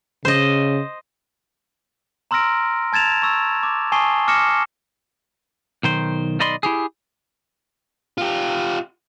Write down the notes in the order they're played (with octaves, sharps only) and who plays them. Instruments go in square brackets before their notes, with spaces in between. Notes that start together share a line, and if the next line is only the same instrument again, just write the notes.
[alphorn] C#3 [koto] C5 D#5
[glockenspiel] A#5 C6 E6 F6 A#6 D7
A5 G#6 A6 E7 F7
C#6 E6
D6
G#5 A5 C#6 D#6 C7 G7
D6 F6 A#6 C#7 E7
[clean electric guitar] B1 D#3 C5
B1 D#3 D5 D#5 B5 C6
E4 G4 G#4
[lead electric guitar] F4 G4